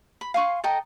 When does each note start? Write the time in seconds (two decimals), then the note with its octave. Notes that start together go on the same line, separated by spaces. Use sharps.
0.21 B5
0.34 F5 G#5 C6 C#6
0.64 A4 D#5 G5 A#5